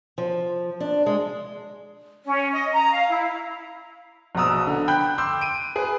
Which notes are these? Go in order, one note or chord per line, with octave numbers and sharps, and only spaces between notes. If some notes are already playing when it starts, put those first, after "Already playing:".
F3
D4
G#3
C#4
D#5
A#5
F5
E4
A#1 B2 B3 A#5 D#6 E6
D3
G5 B5 F#6 G6
C6 D6 E6 G6
D7 D#7
G#4 B4